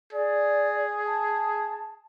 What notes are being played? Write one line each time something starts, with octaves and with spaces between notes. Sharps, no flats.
G#4 D5
A5